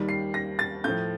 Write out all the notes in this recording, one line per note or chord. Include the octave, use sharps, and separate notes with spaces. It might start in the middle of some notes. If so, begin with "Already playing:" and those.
Already playing: D#2 D#3 G3
C7
A#6
A6
A2 F3 G6